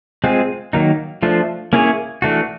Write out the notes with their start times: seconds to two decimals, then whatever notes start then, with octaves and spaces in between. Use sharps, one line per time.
0.24 G#3 C4 F4 G#4
0.73 D#3 F#3 A#3 D#4
1.22 F3 A3 D4 F4
1.73 A#3 C#4 E4 G#4 C#5
2.22 E3 A3 D4 F#4